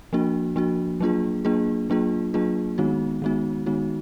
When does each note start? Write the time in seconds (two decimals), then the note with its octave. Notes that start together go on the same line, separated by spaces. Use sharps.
0.13 F3 A#3 D4 F#4
0.56 F3 A#3 D4 F#4
1.00 F#3 A#3 D4 F4 G#4
1.45 F#3 A#3 D4 F4 G#4
1.90 F#3 A#3 D4 F4 G#4
2.34 F#3 A#3 D4 F4 G#4
2.78 D#3 G#3 B3 D#4 F#4
3.22 D#3 G#3 B3 D#4 F#4
3.66 D#3 G#3 B3 D#4 F#4